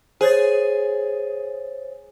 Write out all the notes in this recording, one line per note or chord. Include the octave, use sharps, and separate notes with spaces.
G#4 C5 C#5 A6